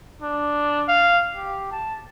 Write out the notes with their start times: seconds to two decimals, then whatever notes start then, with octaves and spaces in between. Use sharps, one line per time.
0.22 D4
0.88 F5
1.36 G4
1.72 A5